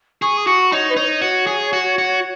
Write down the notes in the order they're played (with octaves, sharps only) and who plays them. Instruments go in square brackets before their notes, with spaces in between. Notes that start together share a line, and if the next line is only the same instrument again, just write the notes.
[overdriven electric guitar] G#4 [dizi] C#6
[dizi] D#6
[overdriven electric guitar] F#4 [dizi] C#6
[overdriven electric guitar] D#4 [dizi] C#5
[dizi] B4
[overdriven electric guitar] D#4 [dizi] C#5
[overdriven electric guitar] F#4
G#4
F#4
F#4